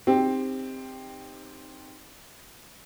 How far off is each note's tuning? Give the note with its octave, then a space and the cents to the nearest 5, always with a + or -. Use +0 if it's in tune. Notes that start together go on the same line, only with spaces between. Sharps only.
C4 +0 D#4 -5 G4 +30